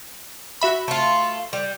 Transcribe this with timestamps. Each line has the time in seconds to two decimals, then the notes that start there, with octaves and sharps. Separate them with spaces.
0.61 F#4 E5 B5
0.88 A3 F4
1.53 G3